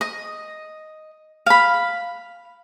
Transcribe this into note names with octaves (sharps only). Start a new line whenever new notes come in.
D#5
F5 B5